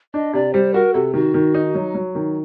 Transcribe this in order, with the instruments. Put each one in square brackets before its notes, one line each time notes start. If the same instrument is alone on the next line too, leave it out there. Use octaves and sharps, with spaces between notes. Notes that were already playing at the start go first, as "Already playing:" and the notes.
[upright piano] D4 [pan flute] D#5
[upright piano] C3 [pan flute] D5
[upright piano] G3 [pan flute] C5
[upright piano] F#4 [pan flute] A#4
[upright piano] C3 [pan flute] A4
[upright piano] D#3 [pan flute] F#4
[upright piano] D#3
D#4
F#3
F#3
D#3